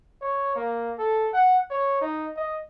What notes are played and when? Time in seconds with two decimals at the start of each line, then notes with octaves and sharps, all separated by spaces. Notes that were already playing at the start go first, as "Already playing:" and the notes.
0.22 C#5
0.56 A#3
0.99 A4
1.34 F#5
1.71 C#5
2.01 D#4
2.37 D#5